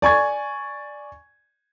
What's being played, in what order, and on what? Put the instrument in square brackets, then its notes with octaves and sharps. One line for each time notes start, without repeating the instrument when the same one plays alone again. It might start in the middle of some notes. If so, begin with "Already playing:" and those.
[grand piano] D5 G#5 C#6 G#6